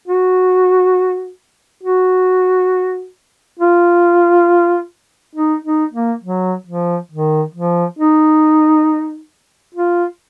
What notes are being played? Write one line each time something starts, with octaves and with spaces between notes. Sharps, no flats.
F#4
F#4
F4
D#4
D#4
A#3
F#3
F3
D#3
F3
D#4
F4